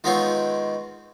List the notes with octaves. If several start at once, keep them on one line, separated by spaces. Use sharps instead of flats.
D#3 G#3 B3 C4 F4 C#5